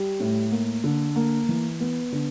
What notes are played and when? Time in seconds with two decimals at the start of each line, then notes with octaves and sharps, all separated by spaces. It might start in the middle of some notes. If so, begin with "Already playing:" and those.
Already playing: G3
0.20 A2
0.51 A#3
0.84 D3
1.16 A#3
1.49 E3
1.80 B3
2.12 D3